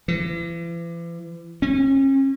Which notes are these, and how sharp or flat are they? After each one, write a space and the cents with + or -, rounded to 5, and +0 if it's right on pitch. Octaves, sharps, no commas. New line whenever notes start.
E3 +40
C#4 -35